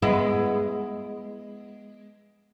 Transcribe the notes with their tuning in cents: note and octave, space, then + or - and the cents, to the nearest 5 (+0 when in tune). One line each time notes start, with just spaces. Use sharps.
G#3 +0 B3 +0 E4 +20